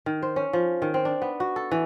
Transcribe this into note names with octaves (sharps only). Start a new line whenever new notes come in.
D#3
C5
C#4
F3
D#3
C4
D4
B3
F#4
A4
E3